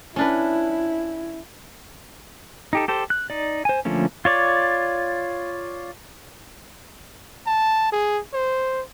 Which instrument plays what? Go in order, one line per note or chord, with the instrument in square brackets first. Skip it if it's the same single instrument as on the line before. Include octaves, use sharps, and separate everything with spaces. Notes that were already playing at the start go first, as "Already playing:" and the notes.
[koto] C#4 D4 B4 [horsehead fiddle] E4
[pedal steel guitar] D#4 G4 A4
G4 A4 C5
F#6
D#4 D5
C5 G#5
D3 F3 A3 A#3 C#4
F4 C#5 D5
[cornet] A5
G#4
C5